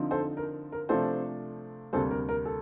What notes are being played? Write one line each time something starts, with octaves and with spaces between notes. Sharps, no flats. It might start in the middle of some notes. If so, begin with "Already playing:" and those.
Already playing: D3 F3 C4 D#4
A4 C5
A#4
A#4
C3 F3 A3 D4 A4 C5
D2 C3 G3 A#3 A4 C5
A#4
A#4
A4